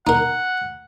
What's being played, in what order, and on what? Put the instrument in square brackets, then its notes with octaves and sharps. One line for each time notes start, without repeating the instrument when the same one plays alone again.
[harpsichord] D#4 A#4 [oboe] F#5